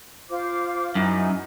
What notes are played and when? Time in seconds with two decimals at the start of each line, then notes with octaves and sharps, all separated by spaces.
0.30 F4 C5 D6
0.95 F#2 D#4 E4 G#5